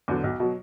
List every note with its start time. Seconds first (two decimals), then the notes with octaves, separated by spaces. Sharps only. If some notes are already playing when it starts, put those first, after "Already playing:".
0.08 E2 D3 F#3
0.24 B1
0.40 B2 F#3